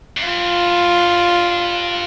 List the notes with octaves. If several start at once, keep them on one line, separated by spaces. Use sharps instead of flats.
F#2
G2 F4